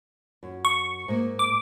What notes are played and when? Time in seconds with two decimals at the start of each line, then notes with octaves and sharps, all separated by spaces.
0.43 F#2
0.65 C#6
1.08 G#2 A#3
1.39 D6